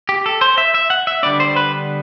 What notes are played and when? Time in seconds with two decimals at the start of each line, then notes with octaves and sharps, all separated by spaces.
0.09 G4
0.26 A4
0.41 C5
0.58 E5
0.74 E5
0.90 F#5
1.07 E5
1.23 D3 G3 B3 D4 D5
1.40 C5
1.56 B4